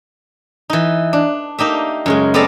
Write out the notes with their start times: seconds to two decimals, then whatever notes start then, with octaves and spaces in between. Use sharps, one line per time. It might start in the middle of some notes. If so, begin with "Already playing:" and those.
0.70 E3 D#4
1.13 D4
1.58 A#3 D#4 G4 E5
2.06 F#2 C#3 G#3
2.34 B3 C4 A4 D5 F5 A#5